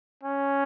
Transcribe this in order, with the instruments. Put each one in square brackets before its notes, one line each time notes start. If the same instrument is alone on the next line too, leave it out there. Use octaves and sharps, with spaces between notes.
[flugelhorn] C#4